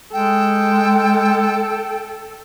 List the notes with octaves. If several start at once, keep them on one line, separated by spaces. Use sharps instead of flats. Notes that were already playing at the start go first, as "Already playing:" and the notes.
G#3 A4 G5